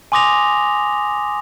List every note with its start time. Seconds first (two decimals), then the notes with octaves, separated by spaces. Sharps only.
0.12 G#5 C6 D6 D#6 A#6 F7